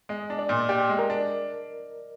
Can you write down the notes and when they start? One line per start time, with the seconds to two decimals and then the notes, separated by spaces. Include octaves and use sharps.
0.09 G#3 D#5
0.30 D4
0.39 D5
0.49 A#2
0.69 G4 D5
0.89 G#3
0.99 A#4
1.10 D4